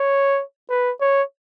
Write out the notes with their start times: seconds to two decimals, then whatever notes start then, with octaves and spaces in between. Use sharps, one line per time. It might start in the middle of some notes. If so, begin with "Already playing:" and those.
Already playing: C#5
0.70 B4
1.01 C#5